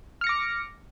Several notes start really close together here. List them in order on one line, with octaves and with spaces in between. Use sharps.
F6 C#7 A#6 D6